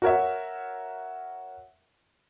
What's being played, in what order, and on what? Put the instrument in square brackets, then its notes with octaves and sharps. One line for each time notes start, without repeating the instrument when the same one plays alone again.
[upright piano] F#4 A#4 C#5 E5